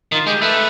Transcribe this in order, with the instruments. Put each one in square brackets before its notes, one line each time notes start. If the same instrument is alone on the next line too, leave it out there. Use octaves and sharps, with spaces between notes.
[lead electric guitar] D#3 [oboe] F4
[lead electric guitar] G#3 [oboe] G4
[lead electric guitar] A3 [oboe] B4